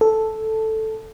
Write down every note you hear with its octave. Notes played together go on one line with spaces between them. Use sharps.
A4